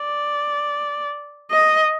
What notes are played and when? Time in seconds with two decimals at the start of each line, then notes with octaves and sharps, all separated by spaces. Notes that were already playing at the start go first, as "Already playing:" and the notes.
Already playing: D5
1.51 D#5